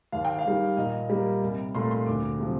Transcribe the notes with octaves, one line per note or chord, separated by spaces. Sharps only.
D#2 F5
G5
F5
D#3 G3
A#2 D#5
G3 A#3
C2
A#2 A3 C6
C6
D2 D6
C3 F3